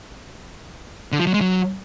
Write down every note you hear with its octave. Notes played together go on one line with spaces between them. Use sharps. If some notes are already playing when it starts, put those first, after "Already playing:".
D3
F3
F#3
G#3
F#3